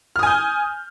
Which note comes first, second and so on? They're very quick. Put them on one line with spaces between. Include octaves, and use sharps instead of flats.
F6 D#6 G#5 G6